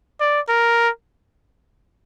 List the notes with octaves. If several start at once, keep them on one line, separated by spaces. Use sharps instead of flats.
D5
A#4